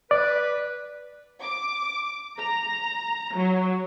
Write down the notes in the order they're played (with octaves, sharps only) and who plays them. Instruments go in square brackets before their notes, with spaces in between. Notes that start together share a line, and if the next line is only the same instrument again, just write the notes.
[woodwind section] B4 [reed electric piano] D5
[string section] D6
A#5
F#3